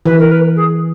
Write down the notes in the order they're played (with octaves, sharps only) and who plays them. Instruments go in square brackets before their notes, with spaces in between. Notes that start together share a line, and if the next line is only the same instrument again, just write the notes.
[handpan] E3 [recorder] B4
[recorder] A#4
B4
G#4